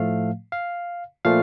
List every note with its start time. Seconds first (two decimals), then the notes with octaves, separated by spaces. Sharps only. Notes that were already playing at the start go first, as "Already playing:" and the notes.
Already playing: A2 F3 A3 F5
0.52 F5
1.25 A#2 F3 A3 F5